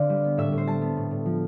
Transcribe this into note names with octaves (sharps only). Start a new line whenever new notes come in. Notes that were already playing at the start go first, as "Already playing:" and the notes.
Already playing: D3 C4 D5 F5
G3
B3
A2 E5
A2
C5
G3 A5
B3
A2
A2
F3